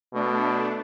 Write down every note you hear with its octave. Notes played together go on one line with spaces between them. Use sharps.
B2 A3 D4